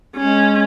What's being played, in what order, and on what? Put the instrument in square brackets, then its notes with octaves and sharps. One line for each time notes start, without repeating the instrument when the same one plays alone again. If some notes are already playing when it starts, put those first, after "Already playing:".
[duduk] G#3 [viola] C#4